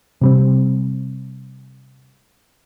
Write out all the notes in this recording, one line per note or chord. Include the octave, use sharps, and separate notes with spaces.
C3 G3 C4